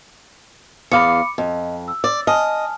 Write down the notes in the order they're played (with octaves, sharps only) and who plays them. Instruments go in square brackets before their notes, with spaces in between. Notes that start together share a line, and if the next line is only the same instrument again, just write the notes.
[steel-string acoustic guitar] E2 F5 [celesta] B5 D6 C#7
[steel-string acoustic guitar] F2 [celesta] D#5
[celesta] E6
[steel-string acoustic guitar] D5
[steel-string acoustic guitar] D#5 [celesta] G#5 A5 F6